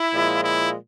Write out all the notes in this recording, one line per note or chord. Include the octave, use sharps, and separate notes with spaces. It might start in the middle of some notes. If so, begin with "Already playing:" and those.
Already playing: E4
A#2 F3 G#3
E4